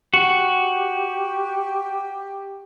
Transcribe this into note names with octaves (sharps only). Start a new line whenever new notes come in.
F#4 G4